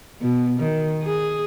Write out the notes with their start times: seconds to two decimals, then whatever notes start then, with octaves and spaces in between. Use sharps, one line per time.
0.21 B2
0.59 D#3
1.02 G#4